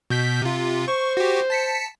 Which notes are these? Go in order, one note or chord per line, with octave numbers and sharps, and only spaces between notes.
B2 G6 B6
C3 F4
C5 C#6
F#4 G4
A5 B6 C#7